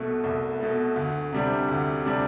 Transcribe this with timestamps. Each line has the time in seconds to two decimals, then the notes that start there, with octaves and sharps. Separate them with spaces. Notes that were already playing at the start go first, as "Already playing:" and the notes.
Already playing: C2 B2 A3
0.24 C2
0.60 B2 A3
0.96 D2
1.32 C3 G3 D4
1.68 D2
2.04 C3 G3 D4